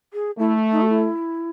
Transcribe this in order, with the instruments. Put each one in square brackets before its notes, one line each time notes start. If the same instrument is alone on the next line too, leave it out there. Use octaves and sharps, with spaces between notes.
[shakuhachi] G#4
[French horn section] A3 [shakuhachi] E4
[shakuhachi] D#4
F#4
E4